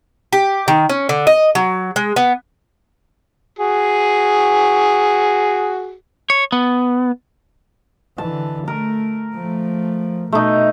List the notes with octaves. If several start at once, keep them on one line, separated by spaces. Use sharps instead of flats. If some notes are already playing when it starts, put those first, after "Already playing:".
G4
D#3
C#4
D3
D#5
F#3
G#3
B3
F#4 G#4
C#5
B3
D3 E3 A5
A3 A#4
F3 A3
B2 A3 D#4